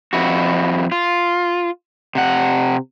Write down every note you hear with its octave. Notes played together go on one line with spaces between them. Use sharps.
F2 E4 F#4
F4
C3 F#5